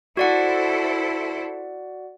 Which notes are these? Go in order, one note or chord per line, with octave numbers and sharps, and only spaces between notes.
E4 F#4 A4 C5 D5 F#5